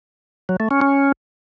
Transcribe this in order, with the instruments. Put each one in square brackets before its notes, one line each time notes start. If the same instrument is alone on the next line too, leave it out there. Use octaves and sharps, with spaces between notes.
[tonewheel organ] F#3
A3
C#4
C#4